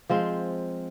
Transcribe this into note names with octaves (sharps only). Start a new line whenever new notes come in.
F3 G#3 C4